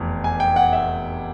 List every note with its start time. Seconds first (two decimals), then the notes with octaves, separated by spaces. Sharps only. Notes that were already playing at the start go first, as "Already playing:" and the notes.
Already playing: F1 E2
0.24 G#5
0.40 G5
0.56 F#5
0.73 E5